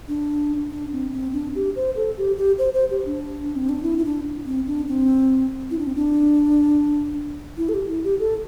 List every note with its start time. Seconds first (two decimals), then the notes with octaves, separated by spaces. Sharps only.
0.08 D4
0.71 D4
0.93 C4
1.13 C4
1.33 D4
1.55 G4
1.76 C5
1.96 A4
2.17 G4
2.37 G4
2.58 C5
2.74 C5
2.90 G4
3.05 D4
3.56 C4
3.69 D4
3.83 E4
3.98 E4
4.05 D4
4.46 C4
4.67 D4
4.88 C4
5.71 E4
5.79 D4
5.87 C4
5.96 D4
7.58 E4
7.69 A4
7.74 G4
7.89 E4
8.04 G4
8.19 A4